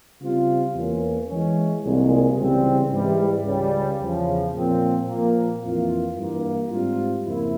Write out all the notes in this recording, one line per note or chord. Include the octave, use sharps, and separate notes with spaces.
C#3 G3 C4 F4
E2 E3 A#3 C#4
E3 G#3 C#4
C2 A#2 G#3
C#2 C#3 E3 G3 C4
G#2 E3 G3
C#2 C#3 G3
E2 C#3 F3
A#2 F3 C4
A#2 F3 A#3
F2 E3 A#3 F4
G2 E3 A#3
G#2 G3 C4 F4
F2 C#3 F3 A#3 E4